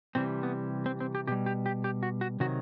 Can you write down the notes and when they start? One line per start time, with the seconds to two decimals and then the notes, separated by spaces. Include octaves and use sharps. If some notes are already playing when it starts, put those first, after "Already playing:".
0.15 C3 E3 G3 C4
0.43 B3
0.86 C4
1.00 C4
1.15 G4
1.27 B2 G3 G4
1.46 G4
1.66 G4
1.84 G4
2.03 F#4
2.21 F#4
2.40 C3 D#3 F#3 F#4